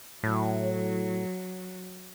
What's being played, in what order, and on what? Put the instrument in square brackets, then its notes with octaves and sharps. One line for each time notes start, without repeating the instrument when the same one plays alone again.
[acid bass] A2 [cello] F#3